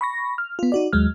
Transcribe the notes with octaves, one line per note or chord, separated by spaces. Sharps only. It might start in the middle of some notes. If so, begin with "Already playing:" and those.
B5 C#6 A#6
F6
B3 F4
D#4 F#4 D5
D#2 F#3 G#3 F6